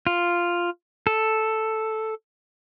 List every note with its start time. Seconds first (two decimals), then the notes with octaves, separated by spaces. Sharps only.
0.07 F4
1.07 A4